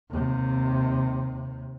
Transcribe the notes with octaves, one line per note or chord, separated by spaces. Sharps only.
D#2 C3